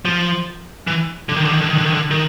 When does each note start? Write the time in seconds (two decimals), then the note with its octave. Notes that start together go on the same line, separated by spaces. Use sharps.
0.05 F3
0.87 E3
1.29 D3
1.36 D#3
1.45 D3
1.53 D#3
1.61 D3
1.69 D#3
1.78 D3
1.86 D#3
1.94 D3
2.11 D#3